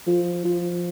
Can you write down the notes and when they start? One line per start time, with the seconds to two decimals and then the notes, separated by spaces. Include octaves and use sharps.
0.07 F3
0.44 F3